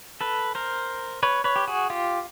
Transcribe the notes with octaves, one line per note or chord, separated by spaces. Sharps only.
A4 B4
A#4 C5
B4 C#5
B4 C#5
G4
F#4 G#4
F4 G4